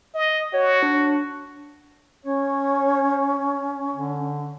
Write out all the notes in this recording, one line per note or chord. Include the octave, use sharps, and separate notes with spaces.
D#5
F#4 C#5
D4
C#4 C#5
D3